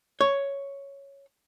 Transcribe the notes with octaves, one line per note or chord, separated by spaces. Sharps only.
C#5